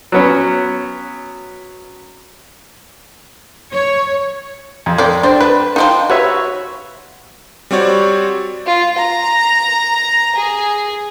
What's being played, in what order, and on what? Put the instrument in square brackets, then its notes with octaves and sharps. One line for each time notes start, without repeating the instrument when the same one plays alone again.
[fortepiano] F#3 B3 C#4
[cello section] C#5
[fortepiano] F2
[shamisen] C4 A4 D5
[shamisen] C4 [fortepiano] D4 C5
[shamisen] B4
F3 C4 D#4
[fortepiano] F#4 C#5 E5 [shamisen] B4
[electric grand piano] G3 C4 F#4 C#5 D5
[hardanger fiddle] F4
A#5
G#4